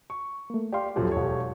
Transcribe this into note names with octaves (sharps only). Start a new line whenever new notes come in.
C#6
A3 A#3
G4 D5 F5 C6
D#1 F#2 F3 G4 A4
E1 C#5